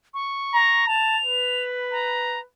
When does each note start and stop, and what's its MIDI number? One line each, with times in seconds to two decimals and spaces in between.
0.14 0.87 85
0.54 0.85 82
0.87 1.17 81
0.87 1.63 101
1.25 2.44 71
1.91 2.39 82